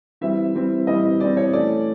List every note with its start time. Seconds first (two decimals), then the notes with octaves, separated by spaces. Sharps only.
0.21 E3 G3 C4 E5
0.54 E3 G3 C4
0.87 E3 G3 C4 D#5
1.20 E3 G3 C4 D5
1.37 C#5
1.53 E3 A3 C#4 D5